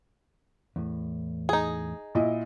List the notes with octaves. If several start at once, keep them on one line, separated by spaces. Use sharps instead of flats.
E2 A2
D#4 G#4
A#2 E4 D#5